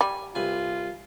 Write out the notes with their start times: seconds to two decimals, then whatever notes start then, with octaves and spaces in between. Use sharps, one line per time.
0.01 G3 G#5
0.35 C2 F4 B4 G#5